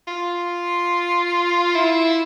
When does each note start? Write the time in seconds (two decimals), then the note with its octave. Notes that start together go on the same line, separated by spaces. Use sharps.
0.08 F4
1.75 E4